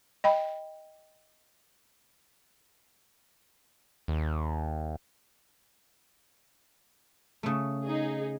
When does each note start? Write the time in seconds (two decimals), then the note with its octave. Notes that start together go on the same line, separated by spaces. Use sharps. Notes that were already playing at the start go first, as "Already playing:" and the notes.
0.24 D#5 G5 B5
4.08 D#2
7.43 C#3 A3
7.85 D#4 G#4